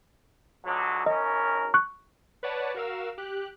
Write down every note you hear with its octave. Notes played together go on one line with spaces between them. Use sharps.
C#2 D3 F#3
G#1 C#4 A#4 D#5
C#6 F#6
B4 C#5 D5 F#5 A5
F#4 A#4 F5 E6
G4 F#6